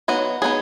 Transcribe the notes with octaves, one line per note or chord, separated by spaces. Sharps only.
F#3 B3 D#4 F#4
F#3 B3 D#4 G#4